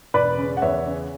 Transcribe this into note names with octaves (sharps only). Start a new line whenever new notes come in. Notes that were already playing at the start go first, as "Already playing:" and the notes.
E1 B4 D5
C#3
F#5
E2 C#5 E5
C#3